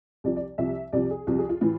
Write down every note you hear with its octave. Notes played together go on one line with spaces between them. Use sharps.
C2 C3 F3 D5
D5
C2 C3 F3 E5
C2 C3 F3 D5
G#4
C2 C3 F3 F4
G#4
F4
A2 E3 F4